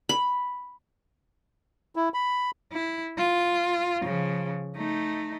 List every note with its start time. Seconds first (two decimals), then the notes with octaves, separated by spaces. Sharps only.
0.09 B5
1.96 E4
2.14 B5
2.73 E4
3.17 F4
4.02 C#3 F3
4.76 A3 D#4